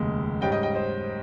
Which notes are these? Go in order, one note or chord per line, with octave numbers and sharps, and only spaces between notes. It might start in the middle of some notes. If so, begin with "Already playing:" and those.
Already playing: F1 D#2 C#3 G#3
G#2 G3 C#4 D#5 G5
D#5 G5
D#5 G5
C5 D#5